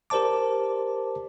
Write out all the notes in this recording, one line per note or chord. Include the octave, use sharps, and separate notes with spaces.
G4 A#4 C5 D5 A5 D6